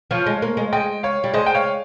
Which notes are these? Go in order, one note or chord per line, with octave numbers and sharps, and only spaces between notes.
F3 C#5 F5
G#3
A#3
G#3
G#3 D#5 G5
C#5 F5
G3
G#3 C5 D#5
G5
C#5 F5